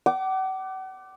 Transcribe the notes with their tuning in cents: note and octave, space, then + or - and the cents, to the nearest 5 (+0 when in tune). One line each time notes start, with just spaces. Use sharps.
F#5 +40 D6 +0